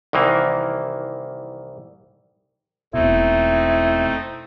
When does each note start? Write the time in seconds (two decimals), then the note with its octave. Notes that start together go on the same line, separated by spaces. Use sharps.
0.13 C2 D#3 E3 A#3
2.94 E1 B2 A3 C4 D#4 E4